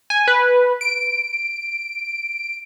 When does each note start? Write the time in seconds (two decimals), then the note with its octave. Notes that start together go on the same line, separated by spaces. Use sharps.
0.10 G#5
0.28 B4
0.81 D7